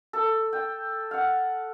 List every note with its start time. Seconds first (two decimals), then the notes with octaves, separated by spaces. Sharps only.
0.13 A4
0.53 G5
1.11 F5 F#5